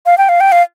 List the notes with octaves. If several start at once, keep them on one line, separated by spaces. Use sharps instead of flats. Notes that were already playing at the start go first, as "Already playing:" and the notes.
F5
G5
F5
G5
F5